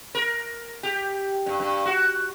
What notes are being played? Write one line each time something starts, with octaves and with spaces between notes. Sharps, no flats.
A#4
G4
G2
G2
F#4